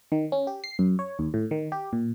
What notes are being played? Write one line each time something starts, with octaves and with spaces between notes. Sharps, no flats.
D#3
C#4
G4
C7
F#2
C#5
D#2
A2
D#3
G4
A#2